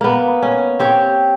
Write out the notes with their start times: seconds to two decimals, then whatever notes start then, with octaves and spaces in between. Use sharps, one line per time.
0.01 A#3 B3
0.42 C#4
0.79 C4 G4 C#5